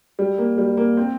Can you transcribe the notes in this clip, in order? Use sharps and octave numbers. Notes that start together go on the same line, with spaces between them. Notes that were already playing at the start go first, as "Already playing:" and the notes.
G3
A#3
G3
A#3
C4